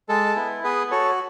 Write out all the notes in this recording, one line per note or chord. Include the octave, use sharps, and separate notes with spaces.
G#3 A4
B3 E4
B3 G#4 B4
F#4 A4 C#5